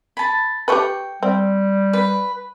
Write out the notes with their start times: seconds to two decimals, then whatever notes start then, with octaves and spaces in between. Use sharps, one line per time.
0.17 A5 B5
0.68 G4 A4 B4 G5 C#6
1.23 G3 C4
1.93 B4